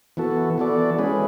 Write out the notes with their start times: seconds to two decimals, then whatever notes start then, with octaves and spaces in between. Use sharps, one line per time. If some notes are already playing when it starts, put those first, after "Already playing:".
0.17 E3 B3 F#4 A4
0.58 E3 B3 F#4 A4 D5
0.98 G#3 C#4 E4 G#4 B4